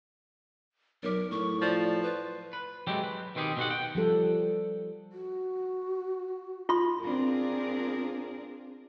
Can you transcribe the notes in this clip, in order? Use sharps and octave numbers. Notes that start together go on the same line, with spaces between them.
B1 F#3 A#4 C#5
A2 C#6
F3 D5
B4
B4
F#3 G#3 A3 C4 G4 G5
B4
B2 D#3 C4 G4 G#4
B2 D3 F#4 G4 F#5
F#5 G5
F3 G3 A4
F#4
F4 C6
B3 C4 D4 F4 G#4 A#4